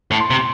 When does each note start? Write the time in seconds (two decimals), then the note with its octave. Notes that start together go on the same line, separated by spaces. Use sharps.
0.11 A2
0.20 C6
0.30 C3